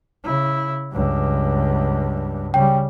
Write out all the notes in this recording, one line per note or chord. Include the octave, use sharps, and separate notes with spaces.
C#3 E4
C#2 G2
C#3 G3 G5